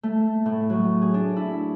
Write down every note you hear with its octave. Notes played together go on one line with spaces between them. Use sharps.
A3
A2
F#3
G#4
D4
E4